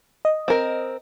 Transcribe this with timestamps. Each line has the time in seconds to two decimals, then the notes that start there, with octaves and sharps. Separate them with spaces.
0.25 D#5
0.48 C4 A#4